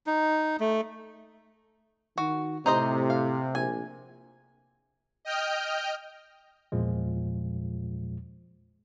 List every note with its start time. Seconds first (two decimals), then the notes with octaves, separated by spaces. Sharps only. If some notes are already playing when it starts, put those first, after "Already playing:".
0.07 D#4
0.60 A3
2.18 D#3 F#4
2.66 A2 C3 D#4 C5 D#5
3.10 F5
3.55 A#1 G#5
5.25 D#5 G5 F6 G6
6.72 E2 A#2 F3 G#3